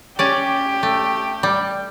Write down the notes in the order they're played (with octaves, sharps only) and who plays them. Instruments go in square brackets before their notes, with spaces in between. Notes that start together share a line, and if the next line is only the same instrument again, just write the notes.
[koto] C#4 D5 [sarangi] G4
[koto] A3
G3